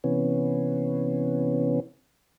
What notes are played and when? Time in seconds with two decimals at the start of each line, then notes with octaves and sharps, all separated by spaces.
0.04 C3 E3 B3 C#4